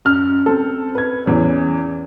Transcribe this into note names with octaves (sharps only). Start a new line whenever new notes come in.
F#2 F6
C4 A4
B4 G#6
E2 E3 C#4